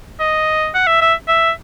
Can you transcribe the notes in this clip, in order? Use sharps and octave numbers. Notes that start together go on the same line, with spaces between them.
D#5
F#5
E5
E5
E5